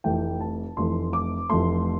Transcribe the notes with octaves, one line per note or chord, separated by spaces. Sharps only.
F1 F2 E3 A3 G5
A5
F1 F2 E3 A3 C6
D6
F1 F2 E3 A3 C6